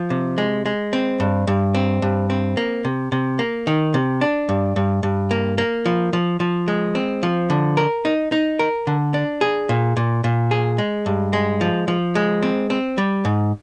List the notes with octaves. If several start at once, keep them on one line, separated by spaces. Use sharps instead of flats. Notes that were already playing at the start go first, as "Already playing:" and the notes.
Already playing: F3
C3
G#3
G#3
C4
G2
G2
C4
G2
C4
A#3
C3
C3
A#3
D#3
C3
D4
G2
G2
G2
A#3
A#3
F3
F3
F3
G#3
C4
F3
D3
A#4
D#4
D#4
A#4
D3
D4
G#4
A#2
A#2
A#2
G#4
G#3
G2
G#3
F3
F3
G#3
C4
C4
G3
G#2